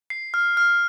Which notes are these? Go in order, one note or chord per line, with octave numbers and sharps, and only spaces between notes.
C7
F6
F6